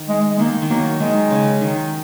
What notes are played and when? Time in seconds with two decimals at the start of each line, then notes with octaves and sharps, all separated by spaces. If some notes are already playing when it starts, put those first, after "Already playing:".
Already playing: D#3
0.09 G#3
0.30 G#3
0.39 D#3 A#3
0.62 D#3
0.70 F#3 A#3
1.00 D#3 G#3
1.30 C#3
1.61 D#3